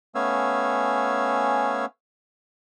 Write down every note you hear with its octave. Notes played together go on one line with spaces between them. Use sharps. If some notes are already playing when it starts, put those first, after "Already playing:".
A3 B3 C#4 F5 G#5 E6